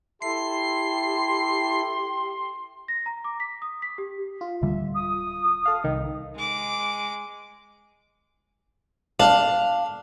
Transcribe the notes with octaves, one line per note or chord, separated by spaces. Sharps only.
E4 G4 A4 C6 C7
A#6
A#5
D6
B6
D#6
B6
G4
F4
D1 D3 G3 E5
D#6
A4 F5
C2 D#3
G#3 D6
D4 F5